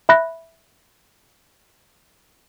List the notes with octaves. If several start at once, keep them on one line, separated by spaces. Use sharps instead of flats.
E5 B5 F#6 A#6